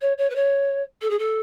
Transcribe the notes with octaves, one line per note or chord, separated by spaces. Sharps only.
C#5
C#5
B4
C#5
A4
G#4
A4